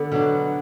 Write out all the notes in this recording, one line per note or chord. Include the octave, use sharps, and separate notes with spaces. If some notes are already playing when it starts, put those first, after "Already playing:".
Already playing: D3 B3
B2 F#3 D4